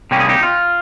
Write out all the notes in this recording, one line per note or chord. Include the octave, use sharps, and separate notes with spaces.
C3 G3 A#3 C#4 G4
G#4
D#4 G4
F4